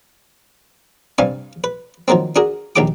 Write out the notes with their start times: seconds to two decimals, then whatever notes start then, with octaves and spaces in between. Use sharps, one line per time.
1.18 G2 C3 G3 F5 G#5
1.64 B4
2.08 D#3 F3 F#3 A#3 C4
2.36 D4 F#4 G#4 A#4
2.76 A#1 D#2 D#3 G4 G5 D6